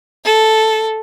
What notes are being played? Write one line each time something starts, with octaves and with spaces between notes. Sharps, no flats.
A4